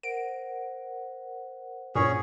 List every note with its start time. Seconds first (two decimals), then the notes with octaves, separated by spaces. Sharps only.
0.03 A#4 C5 F#5 D7
1.95 G2 A#2 C#4 G#4 C#5